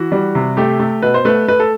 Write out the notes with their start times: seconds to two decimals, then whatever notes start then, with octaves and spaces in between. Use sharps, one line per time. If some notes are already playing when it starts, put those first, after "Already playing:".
Already playing: E3 F#4
0.12 G3
0.35 C3
0.57 A3 G4
0.79 A3
1.02 B2 B4
1.14 C5
1.25 A3 B4
1.48 A3 B4
1.60 A4